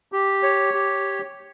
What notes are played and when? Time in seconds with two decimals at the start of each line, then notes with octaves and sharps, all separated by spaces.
0.12 G4
0.43 C#5
0.74 G4